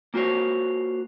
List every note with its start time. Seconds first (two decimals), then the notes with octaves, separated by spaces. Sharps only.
0.14 A#3 F4 F#4 C5 C#5